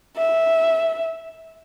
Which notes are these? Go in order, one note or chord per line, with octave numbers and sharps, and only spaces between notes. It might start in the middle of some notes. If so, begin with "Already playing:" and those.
E5